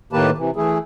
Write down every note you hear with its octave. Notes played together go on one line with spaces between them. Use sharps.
A2 D#3 A#3 G4 B4 A5
C3 E3
E3 A3 E4 G#4